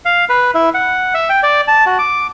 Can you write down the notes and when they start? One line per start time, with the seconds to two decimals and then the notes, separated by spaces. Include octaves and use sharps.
0.05 F5
0.29 B4
0.54 E4
0.74 F#5
1.14 E5
1.30 G5
1.43 D5
1.68 A5
1.86 F#4
1.99 D6